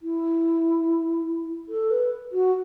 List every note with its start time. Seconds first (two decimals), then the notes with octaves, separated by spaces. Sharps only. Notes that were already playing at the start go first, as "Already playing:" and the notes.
0.02 E4
1.69 A4
1.91 B4
2.32 F#4